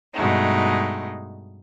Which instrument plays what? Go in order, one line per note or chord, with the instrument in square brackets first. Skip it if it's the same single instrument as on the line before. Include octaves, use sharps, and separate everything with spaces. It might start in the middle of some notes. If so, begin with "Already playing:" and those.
[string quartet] G2 B2 G#3 A3 D#4